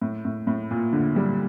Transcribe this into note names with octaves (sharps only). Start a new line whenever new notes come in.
A2
A2
A2
A#2
D3
G3